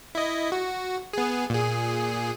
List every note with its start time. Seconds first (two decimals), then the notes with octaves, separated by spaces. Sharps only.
0.15 E4 D#5
0.52 F#4
1.13 B3 G#4
1.50 A#2 G#4